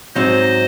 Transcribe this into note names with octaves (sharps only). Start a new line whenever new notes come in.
G#2 F#3 C4 D#4 C5 D#5